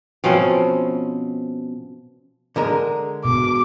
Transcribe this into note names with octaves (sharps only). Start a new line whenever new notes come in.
B2 F3 C4 C#4
D3 G#3 A#4
B2 D6